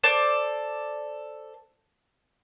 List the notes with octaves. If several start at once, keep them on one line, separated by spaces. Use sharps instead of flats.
A4 C5 D5 D6